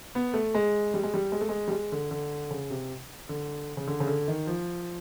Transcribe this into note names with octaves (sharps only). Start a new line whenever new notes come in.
B3
A3
G#3
G3
G#3
G3
G#3
A3
G#3
G3
G#3
D3
D3
C#3
C3
D3
C#3
D3
C#3
D3
D#3
F3